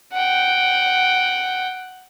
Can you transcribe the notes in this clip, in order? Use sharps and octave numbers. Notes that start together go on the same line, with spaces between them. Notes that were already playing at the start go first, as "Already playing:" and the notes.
F#5 G5